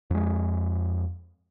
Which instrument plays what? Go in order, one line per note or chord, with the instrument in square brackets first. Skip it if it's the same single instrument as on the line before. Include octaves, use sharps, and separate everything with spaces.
[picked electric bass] F2 G#3